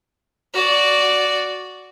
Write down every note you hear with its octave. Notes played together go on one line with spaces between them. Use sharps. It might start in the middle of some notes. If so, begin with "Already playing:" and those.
F#4 D5